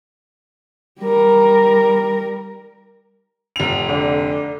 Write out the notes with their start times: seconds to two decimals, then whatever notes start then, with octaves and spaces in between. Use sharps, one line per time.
0.99 G3 A#4
3.56 F1 F7
3.89 D3